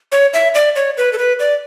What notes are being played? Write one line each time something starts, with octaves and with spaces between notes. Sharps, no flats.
C#5
E5
D5
C#5
B4
A4
B4
D5